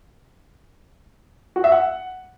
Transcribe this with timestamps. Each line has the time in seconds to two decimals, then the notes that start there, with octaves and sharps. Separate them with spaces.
1.56 F#4
1.64 E5
1.72 F#5